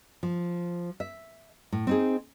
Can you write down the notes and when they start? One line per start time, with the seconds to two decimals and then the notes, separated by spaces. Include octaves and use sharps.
0.23 F3
1.00 E5
1.72 A2
1.87 C4 D#4 G#4